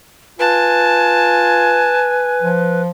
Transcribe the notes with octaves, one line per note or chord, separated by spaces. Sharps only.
F4 B4 G#5 A5
F3